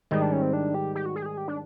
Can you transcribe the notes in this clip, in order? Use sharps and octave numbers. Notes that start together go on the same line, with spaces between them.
G#2 D#3 G3 D#4
D4
C#4
C4
D4
G4
G4
F#4
G#4
G4
G#4
G4
D4